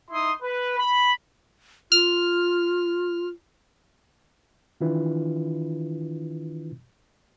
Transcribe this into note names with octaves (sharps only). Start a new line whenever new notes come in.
D#4 E4 C6 D#6
B4
B5
F4 F6
D#3 E3 D4 E4 F4 B4